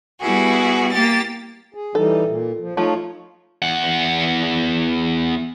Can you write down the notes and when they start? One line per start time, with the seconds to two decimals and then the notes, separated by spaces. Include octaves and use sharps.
0.20 G3 B3 E4 F#4 G#4
0.91 A#3 G4 A6
1.74 G#4
1.95 E3 G3 D#4 A4
2.26 A#2
2.60 F3
2.77 F3 A3 D#4 F4 C#5
3.62 E2 F#5